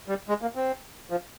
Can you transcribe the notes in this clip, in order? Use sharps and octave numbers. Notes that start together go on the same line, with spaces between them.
G3
G#3
A#3
C4
F3